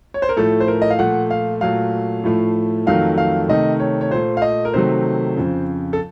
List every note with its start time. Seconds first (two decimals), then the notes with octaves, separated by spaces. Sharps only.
0.14 C#5
0.22 C5
0.29 A#4
0.37 A2 F3 A3 A4
0.60 C5
0.68 A#4
0.82 D#5
0.90 F5
0.99 A#2 F3 A3 F#5
1.31 F5
1.61 A#2 F#3 A3 F5
2.24 A2 F3 A3
2.87 F2 D#3 F#3 A3 F5
3.18 F5
3.48 C3 D#3 A3 D#5
3.80 C#5
4.01 C#5
4.11 A#2 A3 C5
4.37 F5
4.42 D#5
4.65 A#4
4.74 C3 D#3 F#3 A3 C5
5.37 F2 C#3 F3
5.93 A4